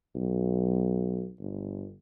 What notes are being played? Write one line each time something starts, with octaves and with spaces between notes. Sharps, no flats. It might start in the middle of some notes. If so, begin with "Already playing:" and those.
B1
G1